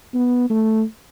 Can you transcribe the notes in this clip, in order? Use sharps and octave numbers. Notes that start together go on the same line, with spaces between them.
B3
A3